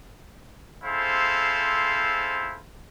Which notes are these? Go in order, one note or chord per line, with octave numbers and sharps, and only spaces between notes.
C4 E4 G#4 A4 C5 F5